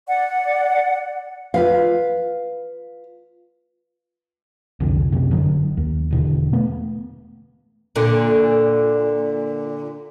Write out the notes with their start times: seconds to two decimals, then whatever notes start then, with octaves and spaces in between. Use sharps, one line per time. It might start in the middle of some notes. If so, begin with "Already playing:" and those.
0.07 D5 F#5
1.54 F4 B4 F5
4.80 C2 F2 D3
5.12 F#2 C3
5.31 G1 D3 F#3
5.77 D#2
6.11 E1 B2 D3
6.53 A3 B3
7.96 A#2 D3